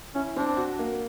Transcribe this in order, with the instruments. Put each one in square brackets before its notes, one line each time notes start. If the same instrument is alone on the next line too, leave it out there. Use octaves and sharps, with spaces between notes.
[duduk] C#4 [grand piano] E4
[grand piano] C4 [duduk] D4
[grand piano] F#4
A#3